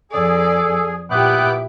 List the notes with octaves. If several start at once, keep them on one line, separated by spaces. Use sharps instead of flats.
F2 G#4 A4 D5
A#2 B3 E4 G4 E5 G5 D6 F#6